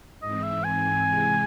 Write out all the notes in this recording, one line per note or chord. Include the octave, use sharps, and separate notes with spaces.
G#2 E3 C4 D#5
E5
G#5
C3 E3 G#3